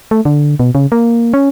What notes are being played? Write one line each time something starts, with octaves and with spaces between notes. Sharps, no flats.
A3
D3
B2
C#3
A#3
C#4